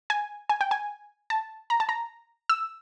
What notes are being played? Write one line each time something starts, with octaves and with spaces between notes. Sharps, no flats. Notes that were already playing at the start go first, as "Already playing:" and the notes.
G#5
G#5
G5
G#5
A5
A#5
A5
A#5
E6